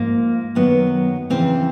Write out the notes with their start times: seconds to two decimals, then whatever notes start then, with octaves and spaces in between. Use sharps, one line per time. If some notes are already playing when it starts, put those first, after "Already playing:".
Already playing: G#2 F3 A#3
0.55 F#2 D#3 F#3 B3
1.30 F2 C#3 E3 C4